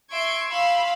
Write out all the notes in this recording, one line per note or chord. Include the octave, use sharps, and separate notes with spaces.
E5 C6 C#6 G#6 D7
F5 B5 C6 E6